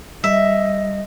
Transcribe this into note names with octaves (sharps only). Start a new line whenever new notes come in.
G3 D#5 E5